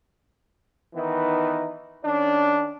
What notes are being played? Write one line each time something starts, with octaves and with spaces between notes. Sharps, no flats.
D#3 E3 B3 D#4
D#3 C#4 D4